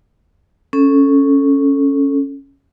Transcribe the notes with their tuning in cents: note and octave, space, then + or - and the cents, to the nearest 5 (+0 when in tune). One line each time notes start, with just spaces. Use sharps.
C#4 +0 A4 +0